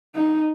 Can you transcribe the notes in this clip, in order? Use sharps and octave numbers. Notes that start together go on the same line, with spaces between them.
D#4